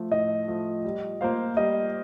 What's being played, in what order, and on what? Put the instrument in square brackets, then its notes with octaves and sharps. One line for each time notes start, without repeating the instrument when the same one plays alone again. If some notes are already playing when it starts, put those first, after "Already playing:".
Already playing: [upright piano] F3 A3
[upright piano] A2 [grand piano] D#5
[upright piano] F3 A3
G3
A#3 F4 C5 F5
[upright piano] G3 [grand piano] D#5